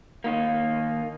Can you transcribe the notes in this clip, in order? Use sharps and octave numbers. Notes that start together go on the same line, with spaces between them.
D#3 A#3